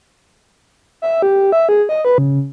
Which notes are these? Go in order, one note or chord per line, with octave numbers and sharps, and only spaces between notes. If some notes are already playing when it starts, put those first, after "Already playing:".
E5
G4
E5
G#4
D#5
B4
C#3